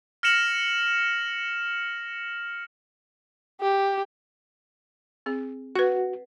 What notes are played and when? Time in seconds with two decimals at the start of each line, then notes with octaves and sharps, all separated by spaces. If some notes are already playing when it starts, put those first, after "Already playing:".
0.23 F6 A#6 C#7 E7 F#7
3.61 G4
5.26 C4 G#4
5.76 F#4 B4 F#5